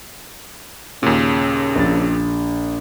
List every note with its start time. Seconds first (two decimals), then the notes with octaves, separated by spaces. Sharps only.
1.03 D#2 A#2 C#3
1.76 A#1 A6